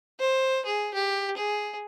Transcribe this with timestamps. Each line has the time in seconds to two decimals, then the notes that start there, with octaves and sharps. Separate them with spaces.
0.20 C5
0.65 G#4
0.94 G4
1.37 G#4